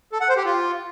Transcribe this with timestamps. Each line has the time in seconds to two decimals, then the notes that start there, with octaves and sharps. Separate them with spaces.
0.12 A4
0.21 F#5
0.29 C5
0.37 G4
0.45 F4